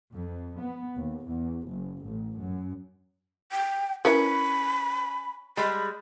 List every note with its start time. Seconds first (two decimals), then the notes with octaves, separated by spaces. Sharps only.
0.15 F2
0.58 B3
0.96 D#2
1.26 E2
1.66 F#1
2.05 A1
2.39 F#2
3.51 G5
4.05 C#4 E4 A#4 B4 B5
5.57 G3 G#3 B5